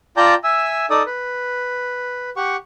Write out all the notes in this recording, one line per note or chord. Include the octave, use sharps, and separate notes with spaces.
F4 D5 G5 A5 A#5 G6
E5 G#5 E6
D#4 A4 D5 D#6
B4
G4 F#5 C#6